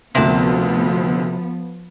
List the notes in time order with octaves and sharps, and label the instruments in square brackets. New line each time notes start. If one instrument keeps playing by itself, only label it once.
[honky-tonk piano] F#1 D2 [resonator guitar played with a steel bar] C3 A5 [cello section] F3 B3